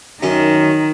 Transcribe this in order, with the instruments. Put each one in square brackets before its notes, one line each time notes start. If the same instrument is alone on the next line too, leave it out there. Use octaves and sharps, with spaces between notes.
[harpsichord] F#2 C#4 [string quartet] D#3